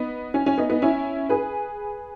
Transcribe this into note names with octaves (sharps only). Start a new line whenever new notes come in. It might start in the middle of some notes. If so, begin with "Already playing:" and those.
Already playing: B3 D#4
C#4
C#4
B3 D#4
B3 D#4
C#4 E4
G#4 B4